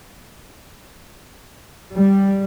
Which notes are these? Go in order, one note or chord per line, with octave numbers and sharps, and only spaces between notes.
G3